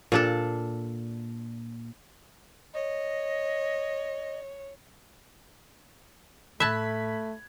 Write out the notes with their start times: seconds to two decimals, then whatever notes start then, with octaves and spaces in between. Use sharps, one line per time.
0.12 A#2 D4 A4
2.74 C#5 D#5
6.60 A2 A3 E5 A5 B5 F#6 G#6 B6